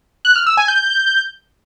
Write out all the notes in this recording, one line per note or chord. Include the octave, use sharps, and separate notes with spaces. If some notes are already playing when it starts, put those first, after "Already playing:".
F#6
F6
E6
G#5
G6